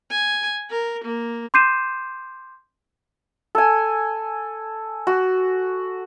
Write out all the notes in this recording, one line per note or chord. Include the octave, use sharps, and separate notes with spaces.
G#5
A#4
A#3
C6 D6 G6 C7 D#7 E7
A4 G#5
F#4